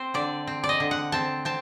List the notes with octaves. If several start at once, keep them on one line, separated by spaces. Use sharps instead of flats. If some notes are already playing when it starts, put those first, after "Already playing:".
Already playing: C4 C5
D3 D5
C4
D5
D#5
D3
F#5
C4 A5
C4 A5